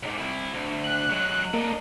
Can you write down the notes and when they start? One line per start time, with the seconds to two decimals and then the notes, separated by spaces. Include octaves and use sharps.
0.03 C#2 G#2
0.18 C2 E4
0.53 D2
0.84 F#6
1.10 F#3 G#3
1.54 A#3 D4 D#5